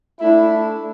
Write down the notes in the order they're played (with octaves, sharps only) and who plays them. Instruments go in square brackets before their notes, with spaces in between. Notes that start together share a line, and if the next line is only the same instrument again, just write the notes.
[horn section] A3 D4 E4